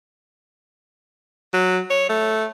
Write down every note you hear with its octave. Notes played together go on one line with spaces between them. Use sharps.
F#3
C#5
A3